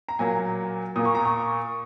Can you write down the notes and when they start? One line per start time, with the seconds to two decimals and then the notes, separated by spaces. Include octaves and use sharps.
0.08 A#5
0.19 A#2 F#3 A#3 G#5
0.96 A#2 A#3 D#6
1.05 C#6
1.15 A#5
1.25 C#6